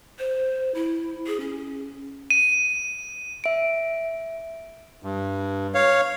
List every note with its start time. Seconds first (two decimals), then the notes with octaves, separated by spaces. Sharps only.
0.19 C5
0.75 E4
1.27 G#4
1.40 C#4
2.30 D#7
3.44 E5 D7
5.03 G2
5.75 C#5 F5